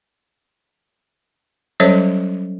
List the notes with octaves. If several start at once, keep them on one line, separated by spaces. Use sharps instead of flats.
F#3 G3 C#4 A4 C5 C#5